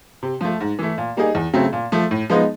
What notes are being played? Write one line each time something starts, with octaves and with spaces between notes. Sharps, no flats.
C3
F3 A3
G#2
E3 A3
A#2
G3 A#3 D#4 G#4
E2
C#3 F#3 A3 C4
A#2
F3 A3
A2
F3 G#3 B3 D#4